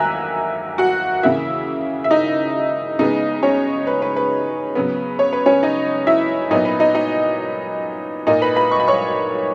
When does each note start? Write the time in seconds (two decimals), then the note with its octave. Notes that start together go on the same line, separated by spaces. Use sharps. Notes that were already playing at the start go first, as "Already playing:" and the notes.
Already playing: E2 D#3 A#3 E5 G#5 A#5 E6 F#6
0.78 F#4 F#5
1.23 C#3 E3 A#3 E4 E5
2.04 E5
2.11 D#4 D#5
2.99 C#3 G#3 B3 D#4 D#5
3.43 C#4 C#5
3.87 B4
4.02 B4
4.16 B4
4.75 C#3 F#3 B3
5.19 C#5
5.33 B4
5.46 C#4 C#5
5.63 D#4 D#5
6.07 E4 E5
6.51 A#2 F#3 B3 D#4 D#5
6.65 B4
6.80 D#4 D#5
6.95 D#4 D#5
8.27 A#2 A#3 D#4 D#5
8.42 B4 B5
8.56 B4 B5
8.71 C#6
8.80 B5
8.88 C#5 C#6